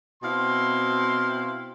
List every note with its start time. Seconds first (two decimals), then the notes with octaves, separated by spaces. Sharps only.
0.23 B2 C4 E4 F5 C6